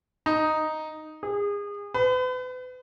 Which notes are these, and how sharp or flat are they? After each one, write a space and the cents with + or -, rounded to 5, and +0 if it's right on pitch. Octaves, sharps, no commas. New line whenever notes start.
D#4 +0
G#4 -30
B4 +40